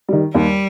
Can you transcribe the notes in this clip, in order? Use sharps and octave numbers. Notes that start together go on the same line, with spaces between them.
D#3 G3
D#2 G3